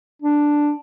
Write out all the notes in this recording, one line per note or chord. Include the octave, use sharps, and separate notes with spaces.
D4